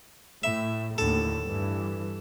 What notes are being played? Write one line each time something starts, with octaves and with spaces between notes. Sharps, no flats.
A2 E5
D#2 A2 D3 A4
G2 E3